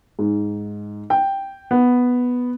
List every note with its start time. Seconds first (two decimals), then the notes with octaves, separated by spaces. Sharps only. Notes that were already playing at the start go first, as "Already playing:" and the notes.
0.19 G#2
1.10 G5
1.71 B3